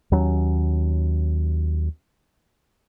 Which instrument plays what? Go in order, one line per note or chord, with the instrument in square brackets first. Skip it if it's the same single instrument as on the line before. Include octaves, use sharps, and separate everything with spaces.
[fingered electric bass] D#2 F#3 C#4